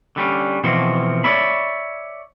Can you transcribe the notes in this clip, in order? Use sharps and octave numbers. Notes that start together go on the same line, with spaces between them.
D3 G3 C#4
B2 E3 F3 C4 F#4
C#5 D5 E5 B5